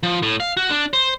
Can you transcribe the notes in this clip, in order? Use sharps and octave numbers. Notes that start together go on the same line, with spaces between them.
F3
A2
F5
F#4
D4
C5